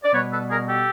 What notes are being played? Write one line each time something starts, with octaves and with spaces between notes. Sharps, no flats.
D5
B2 G3 B3 B4 C#5
A4 B4
G#4 A#4
G4 A4